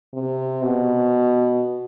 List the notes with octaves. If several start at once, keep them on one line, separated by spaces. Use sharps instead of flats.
C3
B2